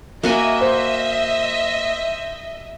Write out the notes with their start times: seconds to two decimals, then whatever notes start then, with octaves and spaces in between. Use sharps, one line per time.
0.23 A#3 F#4 D#5 E5 G#5
0.61 C5